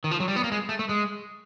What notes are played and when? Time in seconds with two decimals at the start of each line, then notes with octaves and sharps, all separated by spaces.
0.04 D#3
0.11 F3
0.20 F#3
0.28 G3
0.36 B3
0.44 A#3
0.52 G#3
0.69 A3
0.79 A3
0.89 G#3